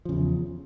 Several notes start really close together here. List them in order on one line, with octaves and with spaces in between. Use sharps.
F3 C#3 E2